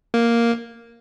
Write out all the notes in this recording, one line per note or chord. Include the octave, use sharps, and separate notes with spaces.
A#3